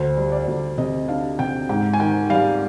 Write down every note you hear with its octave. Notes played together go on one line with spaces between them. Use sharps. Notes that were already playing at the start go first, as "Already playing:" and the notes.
Already playing: D2 C5
G3
D5
D2
C3 D#5
D4 F5
C3 G5
G#2 G5
G#5
D#3 G5
G3 F5